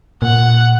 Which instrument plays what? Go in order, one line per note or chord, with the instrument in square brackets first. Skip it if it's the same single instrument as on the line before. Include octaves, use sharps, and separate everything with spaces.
[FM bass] A#2 [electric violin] F#5